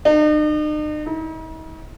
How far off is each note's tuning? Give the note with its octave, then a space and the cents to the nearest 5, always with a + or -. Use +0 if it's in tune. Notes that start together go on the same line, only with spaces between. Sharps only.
D#4 -45
D#4 +45